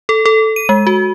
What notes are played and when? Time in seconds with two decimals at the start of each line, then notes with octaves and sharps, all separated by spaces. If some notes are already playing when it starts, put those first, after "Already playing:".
0.09 A4
0.26 A4
0.56 D#7
0.69 G#3
0.87 F#4